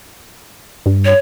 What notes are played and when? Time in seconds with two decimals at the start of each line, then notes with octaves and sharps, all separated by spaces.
0.86 G2
1.05 C#5